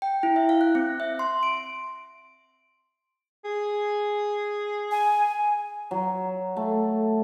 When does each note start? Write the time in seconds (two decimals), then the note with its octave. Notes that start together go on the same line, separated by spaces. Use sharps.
0.02 G5
0.23 E4
0.36 E5
0.49 F5
0.61 F#6
0.75 C4
1.00 E5
1.19 C6
1.43 D7
3.45 G#4
4.91 G#5
5.91 F#3
6.56 A3